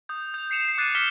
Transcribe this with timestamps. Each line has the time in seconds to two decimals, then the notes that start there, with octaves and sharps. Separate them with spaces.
0.09 D#6 G6
0.34 G6 F7
0.50 G6 C7 C#7 E7 F7
0.64 C7 C#7
0.78 D6 F#6 A6 C7 C#7 D#7
0.95 D6 F6 B6 C#7 E7 G7